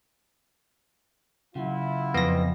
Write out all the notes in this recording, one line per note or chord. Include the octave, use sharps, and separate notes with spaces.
C#3 F#3 E4 F4 F#5
F2 B3 A#6